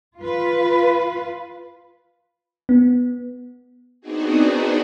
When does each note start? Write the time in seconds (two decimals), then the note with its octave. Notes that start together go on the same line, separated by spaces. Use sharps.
0.19 F4 B4
2.69 B3
4.01 B3 C4 D4 D#4 F#4 G#4